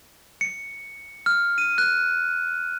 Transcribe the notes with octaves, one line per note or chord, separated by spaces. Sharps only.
C#7
F6
D#7
F#6